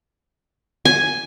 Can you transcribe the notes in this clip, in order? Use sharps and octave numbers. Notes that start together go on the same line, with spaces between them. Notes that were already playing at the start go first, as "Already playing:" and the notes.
G#5